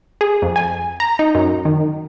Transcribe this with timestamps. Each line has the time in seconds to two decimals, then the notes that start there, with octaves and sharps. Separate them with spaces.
0.21 G#4
0.42 F2
0.56 G#5
1.00 A#5
1.19 D#4
1.35 F#2
1.65 D#3